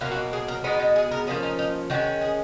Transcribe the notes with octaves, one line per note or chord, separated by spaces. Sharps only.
B2 F#3 A#3 F4
F#4
G#4
A#4
B2 G#3 B3 D#4
D#4
G#4
A#4
F3 A#3 C#4 G#4
D#4
D#4
D#3 G#3 C#4 F#4
G#4